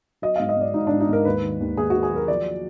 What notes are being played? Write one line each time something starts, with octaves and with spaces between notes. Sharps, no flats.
F#3 D#5
G#2 F5
D#5
G#2 D5
G#2 D#4
G#2 D4
D#4
G#2 A#4
D#2 B4
D#3
D#2
D#2 G#4
D#3 F#4
G#4
F#3
A#4
F3 D5